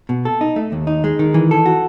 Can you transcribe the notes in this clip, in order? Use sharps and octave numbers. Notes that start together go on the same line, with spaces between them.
B2
A4
D#4
A3
D#2
D#4
G#3
D#3
E3
A4
F#4